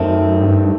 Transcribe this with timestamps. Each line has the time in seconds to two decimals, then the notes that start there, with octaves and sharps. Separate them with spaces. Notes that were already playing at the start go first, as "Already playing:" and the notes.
Already playing: F#2 D#3 A3 C4
0.41 G2